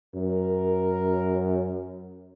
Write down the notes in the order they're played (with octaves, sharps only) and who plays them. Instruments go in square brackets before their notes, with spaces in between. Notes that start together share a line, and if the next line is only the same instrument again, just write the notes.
[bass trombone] F#2 [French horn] A#4